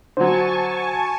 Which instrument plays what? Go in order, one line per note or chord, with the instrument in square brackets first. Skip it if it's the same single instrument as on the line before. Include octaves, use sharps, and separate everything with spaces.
[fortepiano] D3 F#3 [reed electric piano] C5 [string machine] G#5 A5 C#6